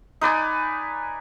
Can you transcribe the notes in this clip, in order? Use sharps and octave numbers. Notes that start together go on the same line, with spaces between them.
D#4 B4 D5 G#5